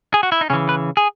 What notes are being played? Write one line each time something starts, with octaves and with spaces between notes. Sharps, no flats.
G#4
F#4
E4
D#4
C#3 E3 C#4
B4
G#4